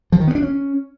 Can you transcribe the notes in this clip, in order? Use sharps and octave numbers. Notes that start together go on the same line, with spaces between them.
F3
D#3
B3
D4
C#4